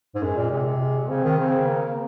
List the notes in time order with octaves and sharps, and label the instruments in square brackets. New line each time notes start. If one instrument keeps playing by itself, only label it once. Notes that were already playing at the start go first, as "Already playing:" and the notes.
[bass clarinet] G#2
[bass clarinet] F#2 [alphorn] G#3
[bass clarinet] A#2
[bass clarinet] C3 [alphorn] G#3
[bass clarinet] C3
[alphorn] G#3
[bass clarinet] C#3 [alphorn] C4
[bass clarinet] D#3
[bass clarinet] C#3 [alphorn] C4
[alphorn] A#3